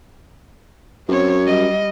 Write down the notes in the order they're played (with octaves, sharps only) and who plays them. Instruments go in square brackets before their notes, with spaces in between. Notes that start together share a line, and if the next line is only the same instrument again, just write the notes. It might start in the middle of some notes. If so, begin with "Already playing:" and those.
[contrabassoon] F#2 [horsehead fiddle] C4 C#5
[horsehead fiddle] G3 D#5